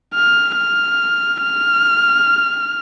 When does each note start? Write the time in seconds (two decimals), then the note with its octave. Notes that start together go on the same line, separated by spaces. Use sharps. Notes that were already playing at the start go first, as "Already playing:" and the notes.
0.14 F6
0.57 F6
1.43 F6